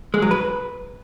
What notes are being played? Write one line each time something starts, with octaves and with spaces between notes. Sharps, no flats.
G#3
F#3
B4